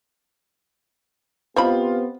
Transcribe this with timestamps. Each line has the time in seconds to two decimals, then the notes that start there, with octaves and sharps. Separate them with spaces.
1.56 B3 C4 F4 G4 C5 D#5 B5